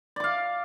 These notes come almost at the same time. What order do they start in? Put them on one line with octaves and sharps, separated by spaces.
D5 D6 F5